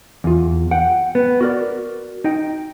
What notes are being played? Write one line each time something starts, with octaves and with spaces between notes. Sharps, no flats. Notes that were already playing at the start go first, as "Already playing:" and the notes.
E2 F4
F#5 G5
B3
F#4 A#4 D5
D#4 D#5 G5